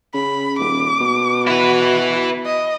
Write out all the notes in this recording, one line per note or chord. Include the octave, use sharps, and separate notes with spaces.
C#3 B5
D#1 D6
B2
E4 F#4 B4
D#5